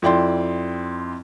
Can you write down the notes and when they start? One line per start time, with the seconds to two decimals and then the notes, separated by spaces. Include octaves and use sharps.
0.02 F2 E4 D5 G5 C6